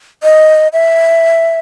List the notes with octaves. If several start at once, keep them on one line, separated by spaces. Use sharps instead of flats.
D#5
E5